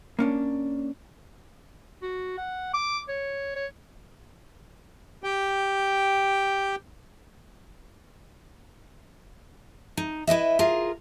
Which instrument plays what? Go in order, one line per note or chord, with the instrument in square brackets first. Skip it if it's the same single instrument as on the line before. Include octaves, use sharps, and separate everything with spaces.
[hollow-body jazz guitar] A#3 C#4 D4
[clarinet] F#4
F#5
D6
C#5
C#5
[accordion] G4 G5
[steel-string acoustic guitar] D#4
E4 B4 D#5 E5
F4 G#4 A#4